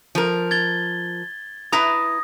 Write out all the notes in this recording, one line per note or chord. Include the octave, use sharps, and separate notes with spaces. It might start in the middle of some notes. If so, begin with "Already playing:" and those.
F3 A#4
G#6 A6 G7
E4 B4 A#5 D#6 A#6